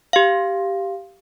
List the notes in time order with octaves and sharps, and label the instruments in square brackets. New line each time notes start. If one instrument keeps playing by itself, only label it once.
[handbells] G4 F5